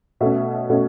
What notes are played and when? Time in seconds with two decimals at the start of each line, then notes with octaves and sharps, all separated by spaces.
0.21 B2 A3 C#4 E5
0.69 B2 A3 C#4